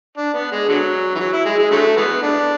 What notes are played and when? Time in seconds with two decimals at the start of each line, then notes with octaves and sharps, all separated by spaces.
0.17 D4
0.34 B3
0.51 G#3
0.68 D3 F#3
1.15 E3
1.19 F#3
1.33 E4
1.46 G#3
1.59 G#3
1.71 D3 F#3 A3
1.97 E3 G#3 B3
2.23 D4